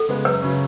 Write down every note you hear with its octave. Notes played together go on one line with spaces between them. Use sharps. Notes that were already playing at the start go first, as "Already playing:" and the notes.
Already playing: A4
C#3 G#3 B3
F#2 B4
C#3 F#3 C#4